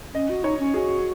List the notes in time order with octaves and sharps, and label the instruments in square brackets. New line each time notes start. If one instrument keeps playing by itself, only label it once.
[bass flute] C#4 [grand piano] D#5
[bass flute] F#4
[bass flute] D#4 [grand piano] C#5
[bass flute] C#4
[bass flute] F#4 [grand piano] G#4